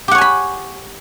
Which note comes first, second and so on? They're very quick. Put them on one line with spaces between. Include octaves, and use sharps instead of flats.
G4 F#5 C#5 G#5 B5